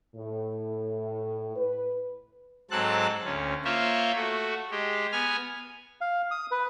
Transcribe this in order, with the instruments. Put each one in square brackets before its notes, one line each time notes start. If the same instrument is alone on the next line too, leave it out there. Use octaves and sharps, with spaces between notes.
[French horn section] A2
B4
[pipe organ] G#2 F#3 C4 A4 A5 F#6
D2 C#4
A#3 F4 C5 C#5 E5
A3 F#4
G#3 G4
B3 G#5 F6
[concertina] F5
D#6
B4